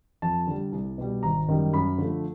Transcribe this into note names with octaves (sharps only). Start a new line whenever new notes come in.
F2 A5
D3 G3
C2
B2 G3
G#1 A#5
F#2 D#3 G3
F#2 B5
D3 F3 A3